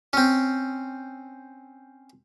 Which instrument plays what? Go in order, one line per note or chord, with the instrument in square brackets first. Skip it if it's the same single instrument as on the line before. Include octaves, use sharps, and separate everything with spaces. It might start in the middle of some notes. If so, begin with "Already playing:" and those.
[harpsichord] C4 C#4